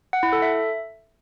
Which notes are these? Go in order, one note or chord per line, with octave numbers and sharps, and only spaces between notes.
F#5
E4
A4
E5